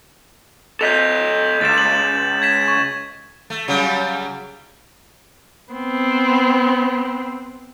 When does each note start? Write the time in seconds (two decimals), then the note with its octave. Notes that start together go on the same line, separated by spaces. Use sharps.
0.81 A4 D#5 G6 B6 F7
1.61 C#2 A6 E7
1.78 F#7
2.42 G#6 B6 E7
2.68 C#6
3.50 A3
3.68 C#3 F#3 G3
5.73 B3 C4